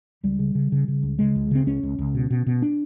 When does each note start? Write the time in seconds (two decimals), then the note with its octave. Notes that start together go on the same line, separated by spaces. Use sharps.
0.23 C#2 G3
0.39 C#3
0.55 C#3
0.72 C#3
0.88 C#3
1.03 C#2
1.19 C#3 G#3
1.35 C#2
1.51 C#3 C4
1.67 C#2 C#4
1.83 C#2
1.99 C#2
2.15 B2
2.30 B2
2.46 B2
2.62 D4